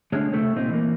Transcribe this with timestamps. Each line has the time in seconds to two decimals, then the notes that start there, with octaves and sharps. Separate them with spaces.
0.12 A2 D3 G#3 C#4
0.33 C#2 C3 A3 C4
0.56 C2 A#2 C4 D#4
0.69 E3 A#3